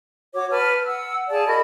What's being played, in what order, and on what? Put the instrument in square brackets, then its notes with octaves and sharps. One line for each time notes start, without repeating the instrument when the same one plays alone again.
[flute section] F#4 C#5 D6
B4 A5 F6
F#5 E6
G#4 D5 F5 A5
F#4 A#4 D#5 B5